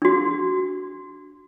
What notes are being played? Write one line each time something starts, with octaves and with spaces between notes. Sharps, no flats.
D4 F#4